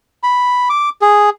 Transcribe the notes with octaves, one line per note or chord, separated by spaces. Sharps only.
B5
D6
G#4